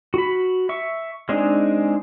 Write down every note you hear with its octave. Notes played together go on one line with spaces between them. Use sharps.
F#4 B5
E5 C#6
G#3 C4 D4 D#4 G#4